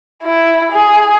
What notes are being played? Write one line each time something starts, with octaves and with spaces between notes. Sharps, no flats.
E4
G#4